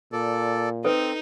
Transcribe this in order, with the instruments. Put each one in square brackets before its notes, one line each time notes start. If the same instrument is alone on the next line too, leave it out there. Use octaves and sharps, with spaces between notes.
[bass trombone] A#2 [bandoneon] A4 D5
[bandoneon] C4 [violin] D#4 [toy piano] A4 B4